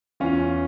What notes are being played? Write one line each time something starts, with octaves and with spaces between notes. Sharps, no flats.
E2 E3 C#4 F4